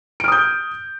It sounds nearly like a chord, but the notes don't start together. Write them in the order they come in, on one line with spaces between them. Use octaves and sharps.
D7 F6 D#6 G6